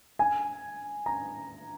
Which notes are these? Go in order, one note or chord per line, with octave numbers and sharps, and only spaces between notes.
G#5
A#5